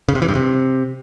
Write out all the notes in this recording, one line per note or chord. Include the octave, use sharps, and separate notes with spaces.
C#3
C3
E3
G2
C3